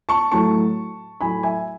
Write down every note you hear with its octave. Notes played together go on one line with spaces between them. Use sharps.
A5 C#6
A2 F#3 A3 A5 C#6
A2 F#3 A3 G#5 B5
E5 G#5